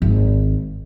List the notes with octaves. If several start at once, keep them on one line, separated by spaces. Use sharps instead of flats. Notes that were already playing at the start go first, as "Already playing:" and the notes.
G#1